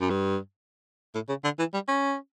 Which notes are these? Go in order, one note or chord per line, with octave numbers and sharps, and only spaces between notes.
F#2
G2
A2
C#3
D3
E3
G3
C#4